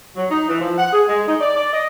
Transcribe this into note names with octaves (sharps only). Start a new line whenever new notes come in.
F#3
D#4
E3
F3
F#5
G#4
G#3
D#4
D5
D5
D#5